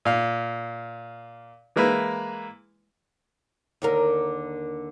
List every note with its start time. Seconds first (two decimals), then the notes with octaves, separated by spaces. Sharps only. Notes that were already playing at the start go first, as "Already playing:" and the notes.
0.05 A#2 F5
1.76 E3 G#3 A#3 E4 B4
3.82 D#2 D3 A#4